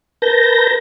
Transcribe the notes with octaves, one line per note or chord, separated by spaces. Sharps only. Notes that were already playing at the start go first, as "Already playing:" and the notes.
A#4 B4 A5 G6 A#6